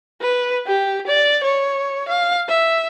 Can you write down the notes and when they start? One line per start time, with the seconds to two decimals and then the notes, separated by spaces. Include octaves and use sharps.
0.21 B4
0.67 G4
1.07 D5
1.44 C#5
2.08 F5
2.49 E5